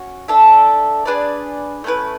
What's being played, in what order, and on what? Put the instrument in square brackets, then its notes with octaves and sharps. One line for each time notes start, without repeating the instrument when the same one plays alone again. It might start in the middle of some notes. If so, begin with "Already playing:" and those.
Already playing: [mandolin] C#4 F#4
D4 A4 E5
D4 G#4 B4 D5
A3 C#4 E4 B4